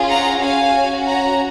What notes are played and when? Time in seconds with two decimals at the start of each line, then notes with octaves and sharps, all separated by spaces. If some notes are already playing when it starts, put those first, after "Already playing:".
Already playing: C#4 F4 G#4
0.08 F#5 A#5
0.41 C#4 F#4 F5 G#5
1.07 F#5 A#5